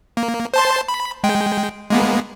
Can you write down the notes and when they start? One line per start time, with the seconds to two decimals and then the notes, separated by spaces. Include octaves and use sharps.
0.17 A#3
0.54 C5 A5 C6
0.88 B5
1.24 G#3 G5
1.90 G#3 A#3 B3